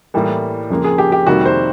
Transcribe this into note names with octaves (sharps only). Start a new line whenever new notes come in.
A2 E3 G3 A#3
F2 C#3 F3 A#3
G#4
G4
G4
F2 C3 D#3 G3 A#3 F#4
C5